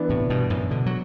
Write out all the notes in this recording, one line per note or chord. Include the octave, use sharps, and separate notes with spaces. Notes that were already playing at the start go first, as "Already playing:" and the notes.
Already playing: E3 B3 D4
A2 C3
G2 B2
F#2 A2
B2 D3
F#3